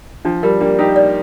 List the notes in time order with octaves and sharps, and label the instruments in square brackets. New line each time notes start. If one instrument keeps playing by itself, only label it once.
[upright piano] F3 [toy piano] D4
[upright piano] G3 [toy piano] A#4
[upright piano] G3 A#3 [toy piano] D4
[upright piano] D#4 G4 [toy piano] A#4
[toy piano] D5